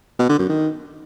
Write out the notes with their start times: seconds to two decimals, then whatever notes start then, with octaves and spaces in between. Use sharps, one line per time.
0.19 B2
0.29 D3
0.39 F#2
0.49 D#3